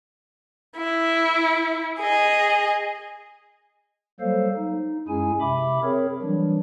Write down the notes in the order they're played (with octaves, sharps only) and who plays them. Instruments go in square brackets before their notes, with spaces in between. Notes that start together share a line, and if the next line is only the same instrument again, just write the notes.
[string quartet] E4
G#4 D#5
[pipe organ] F#3 G3 A#3 A4 C5 F5
D#4
F#2 G#3 C#4 E4 G#4 G#5
C3 E5 B5 D6
C4 G#4 A#4 C#5
E3 F#3 G3 D4